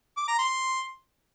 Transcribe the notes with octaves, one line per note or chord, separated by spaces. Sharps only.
D6
A#5
C6